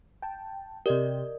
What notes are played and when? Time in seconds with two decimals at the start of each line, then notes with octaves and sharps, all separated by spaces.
0.22 G5 A5
0.86 C3 G4 A#4 D5 D#5